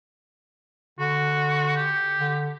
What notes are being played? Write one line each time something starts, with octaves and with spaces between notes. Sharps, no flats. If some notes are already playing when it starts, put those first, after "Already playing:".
D3 F#4
G4
D3